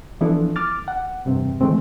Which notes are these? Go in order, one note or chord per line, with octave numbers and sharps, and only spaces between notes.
E3 F3 B3 D4 E4 A4
D6 F6 A6
F#5
E2 G2 C3 C4
D#3 E3 G#3 A3 C4